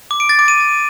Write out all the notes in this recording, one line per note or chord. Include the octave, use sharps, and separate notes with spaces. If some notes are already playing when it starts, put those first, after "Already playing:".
D6
D7
A6
D6
D#7